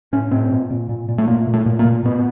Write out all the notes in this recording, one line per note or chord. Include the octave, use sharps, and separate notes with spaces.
A2 C#4
A2 C4
A#2
A#2
A#2
A#2
A3
A#2 A#3
A#2
A3
A#2
A#3
A#2
A#2 B3